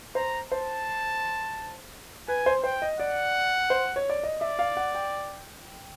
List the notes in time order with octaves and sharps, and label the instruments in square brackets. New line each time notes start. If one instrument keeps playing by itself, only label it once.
[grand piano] C5 [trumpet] A#5
[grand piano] C5 [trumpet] A5
[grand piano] B4 [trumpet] G#5
[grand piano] C5
[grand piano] C5 [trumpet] G5
[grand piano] D#5
[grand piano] D5 [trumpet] F#5
[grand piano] C5
C#5
D5
D#5
[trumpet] D5 [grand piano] E5
[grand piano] F5
F#5
G5